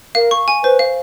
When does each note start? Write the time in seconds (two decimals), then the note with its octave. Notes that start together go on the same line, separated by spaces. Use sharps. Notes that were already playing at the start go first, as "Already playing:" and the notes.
0.15 A#4 F5
0.31 C#6
0.48 G#5
0.63 B4 C5
0.79 F5